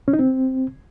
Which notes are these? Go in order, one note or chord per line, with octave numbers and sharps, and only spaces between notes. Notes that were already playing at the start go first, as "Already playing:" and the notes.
C#4
D#4
C4